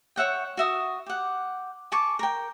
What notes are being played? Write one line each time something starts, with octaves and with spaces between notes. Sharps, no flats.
C#5 E5 F#5 G5
F#4 E5 D#6
G4 F#5
G#5 A5 C#6 D6
A#4 G5